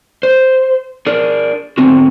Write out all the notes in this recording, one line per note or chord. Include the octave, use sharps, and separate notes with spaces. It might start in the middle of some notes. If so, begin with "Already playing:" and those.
C5
D4 G#4 A#4
G#2 D3 F3 B3 C4 F#4